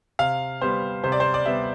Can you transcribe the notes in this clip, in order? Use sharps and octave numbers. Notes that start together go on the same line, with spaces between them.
C3 F5
G3 B3 C5
C3 C5
D5
C5
D5
G3 B3 E5